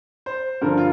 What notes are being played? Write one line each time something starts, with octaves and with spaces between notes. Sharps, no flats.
C5
G2 D3 F3 A#4
F4